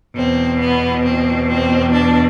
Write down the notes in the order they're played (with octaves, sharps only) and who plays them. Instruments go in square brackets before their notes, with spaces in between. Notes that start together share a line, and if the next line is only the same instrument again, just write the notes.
[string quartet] E2 B2 C4
B3
C4
C4
D4